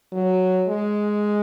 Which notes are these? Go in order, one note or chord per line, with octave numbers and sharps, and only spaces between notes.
F#3
G#3